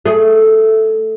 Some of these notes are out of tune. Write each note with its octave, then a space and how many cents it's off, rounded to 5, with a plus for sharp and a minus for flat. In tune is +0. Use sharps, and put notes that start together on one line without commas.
A3 +0 G#4 +20